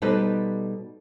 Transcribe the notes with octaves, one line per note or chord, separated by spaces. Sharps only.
B2 G3 D#4 A4 B4 C5